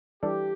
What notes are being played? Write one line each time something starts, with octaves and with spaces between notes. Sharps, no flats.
E3 G3 D4 G4 A4 D5